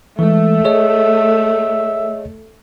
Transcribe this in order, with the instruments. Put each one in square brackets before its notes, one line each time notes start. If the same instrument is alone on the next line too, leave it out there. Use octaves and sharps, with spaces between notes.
[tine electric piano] E3 G#3 [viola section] A3 [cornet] E5
[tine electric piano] G#4 C#5 D#5